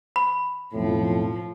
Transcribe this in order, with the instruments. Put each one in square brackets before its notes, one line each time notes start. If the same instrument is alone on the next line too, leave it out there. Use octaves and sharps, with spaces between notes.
[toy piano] B5
[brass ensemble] B1 F2 A2 [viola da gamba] F3